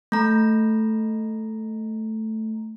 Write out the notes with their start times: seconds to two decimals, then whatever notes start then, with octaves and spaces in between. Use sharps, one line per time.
0.12 A3 A#5